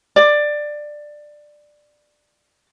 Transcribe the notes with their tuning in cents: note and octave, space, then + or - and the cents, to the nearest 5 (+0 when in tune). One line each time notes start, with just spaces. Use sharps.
D5 +15